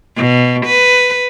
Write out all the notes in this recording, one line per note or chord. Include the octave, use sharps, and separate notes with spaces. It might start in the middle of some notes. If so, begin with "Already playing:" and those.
B2
B4